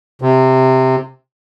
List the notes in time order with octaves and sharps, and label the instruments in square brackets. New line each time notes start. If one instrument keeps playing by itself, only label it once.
[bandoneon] C3